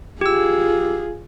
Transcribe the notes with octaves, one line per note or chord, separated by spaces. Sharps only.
F4 G4 G#4 E6